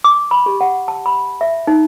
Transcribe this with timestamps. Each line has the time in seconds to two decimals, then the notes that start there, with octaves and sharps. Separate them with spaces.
0.04 D6
0.31 B5
0.46 G4
0.61 F#5
0.88 A5
1.06 B5
1.41 E5
1.67 D#4